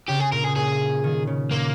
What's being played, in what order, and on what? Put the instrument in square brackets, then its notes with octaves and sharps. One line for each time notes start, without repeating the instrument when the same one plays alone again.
[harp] C#3 [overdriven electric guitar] G4
[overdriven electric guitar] G#4
[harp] A#2 [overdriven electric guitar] A#4
[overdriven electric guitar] G#4
[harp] A#2 [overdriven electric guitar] G#4
[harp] D#3
C#3
[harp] A#2 [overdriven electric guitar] A#3